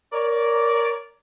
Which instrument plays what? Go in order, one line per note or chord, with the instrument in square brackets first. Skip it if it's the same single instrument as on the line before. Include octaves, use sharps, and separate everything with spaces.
[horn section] A#4 C#5 D5